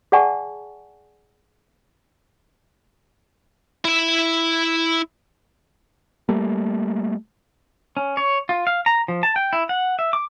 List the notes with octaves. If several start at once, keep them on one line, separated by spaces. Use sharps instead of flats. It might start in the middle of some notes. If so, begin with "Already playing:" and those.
G#4 D5 F#5 G#5 A5 C#6
E4 E5
G3 A3 A#3
C#4
C#5
F4
F5
A#5
F3
A5
G5
E4
F#5
E5
D6